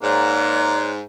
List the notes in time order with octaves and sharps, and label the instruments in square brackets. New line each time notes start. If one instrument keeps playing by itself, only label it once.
[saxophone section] G#2 [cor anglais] A#3 [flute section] C#5 D5 F#6